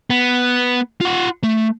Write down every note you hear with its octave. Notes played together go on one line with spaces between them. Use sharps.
B3
F4 F#5
A3